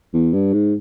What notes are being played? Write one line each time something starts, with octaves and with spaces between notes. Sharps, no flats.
E2
G2
G#2